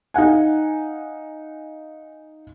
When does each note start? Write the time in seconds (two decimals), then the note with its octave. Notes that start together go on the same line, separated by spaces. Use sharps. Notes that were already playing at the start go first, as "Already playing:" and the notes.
0.14 D#4 F5 F#5 G#5